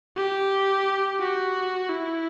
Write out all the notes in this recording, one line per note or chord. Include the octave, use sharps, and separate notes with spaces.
G4
F#4
E4